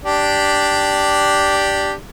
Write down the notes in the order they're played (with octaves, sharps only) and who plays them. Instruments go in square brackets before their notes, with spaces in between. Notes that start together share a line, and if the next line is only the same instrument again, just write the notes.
[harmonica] D4 G4 D5